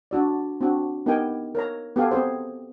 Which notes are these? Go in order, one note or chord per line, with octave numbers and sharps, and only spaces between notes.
D4 F#4 D5
C4 D4 F#4
B3 D#4 G4 A#4 G5 G#5
A#4 C#5 A#5
B3 G4 A4 F5 G#5
C4 G#4 C5